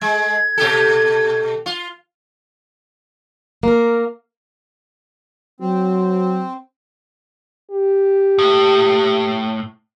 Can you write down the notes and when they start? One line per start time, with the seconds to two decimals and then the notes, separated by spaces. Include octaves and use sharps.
0.01 G#3 G#6
0.58 B2 G4 A4
1.66 F4
3.63 A#3 A#4
5.60 F#3 C4
7.71 G4
8.39 A2